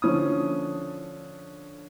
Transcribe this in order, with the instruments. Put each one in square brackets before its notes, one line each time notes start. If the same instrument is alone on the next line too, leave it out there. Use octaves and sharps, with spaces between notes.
[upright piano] D3 F3 C#4 D#6